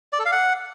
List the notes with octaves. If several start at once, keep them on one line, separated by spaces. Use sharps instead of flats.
D5
A4
F5
F#5